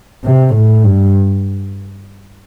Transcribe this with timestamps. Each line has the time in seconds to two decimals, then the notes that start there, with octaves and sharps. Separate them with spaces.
0.24 C3
0.55 A2
0.84 G2